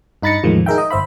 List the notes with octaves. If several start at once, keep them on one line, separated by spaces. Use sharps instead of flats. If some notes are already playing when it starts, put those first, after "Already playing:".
G2 D#4 B5 A6 A#6 C#7
E2 A2 D#3 F3 G#3
D#4 G#4 A#4 E5 G5
D#5
G1 C5 E5 B5